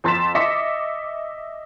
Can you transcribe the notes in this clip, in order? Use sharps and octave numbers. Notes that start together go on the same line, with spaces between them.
F2 C6 A6 B6 E7
D#5 E5 D6 A#6 B6 C#7